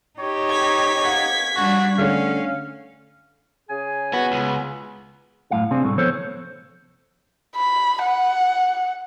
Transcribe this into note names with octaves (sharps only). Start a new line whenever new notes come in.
D#4 G4 C#5
G#6 B6
F5 F#5
G3 D4 F#4
D3 A3 C#4 C#5 F5
C#3 G#4 G#5
B3 F#4
C#2
F#2 A2 F5
C3 C4 D4 G#4
C2 A2 A3
F3 B3 A4 C5 C#5
B5
F#5